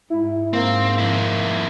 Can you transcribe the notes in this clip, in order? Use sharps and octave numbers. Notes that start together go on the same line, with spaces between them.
G#2 E4
G#2 A#3 C4
F2 E4